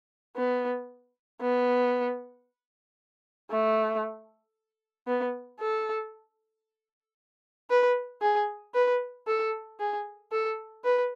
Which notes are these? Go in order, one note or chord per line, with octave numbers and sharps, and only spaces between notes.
B3
B3
A3
B3
A4
B4
G#4
B4
A4
G#4
A4
B4